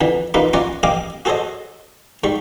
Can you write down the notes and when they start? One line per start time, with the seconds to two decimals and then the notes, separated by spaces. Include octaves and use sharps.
0.01 F2 D3 E3
0.34 A1 F#3 A#3 D#4 F4 B4
0.53 C#4 F4 C#5 D5 F#5 A#5
0.83 A1 D#5 F5 G5 G#5 D6
1.25 F#4 G#4 A4 C5 C#5 D#5
2.24 G#2 G3 C#6